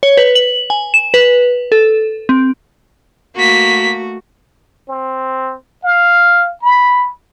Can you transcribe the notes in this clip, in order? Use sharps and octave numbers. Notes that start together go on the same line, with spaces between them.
C#5
B4
F#7
G#5
E7
B4
A4
C4
A3 A#3 F#4 B6
C4
F5
B5